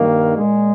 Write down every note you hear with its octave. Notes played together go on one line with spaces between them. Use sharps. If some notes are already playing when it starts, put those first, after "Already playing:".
Already playing: G2 D#3 A#3
A#2 G#3